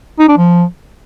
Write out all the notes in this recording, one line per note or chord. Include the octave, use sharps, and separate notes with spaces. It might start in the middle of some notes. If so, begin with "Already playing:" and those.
D#4
D4
F3